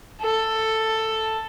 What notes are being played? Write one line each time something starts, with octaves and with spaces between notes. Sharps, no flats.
A4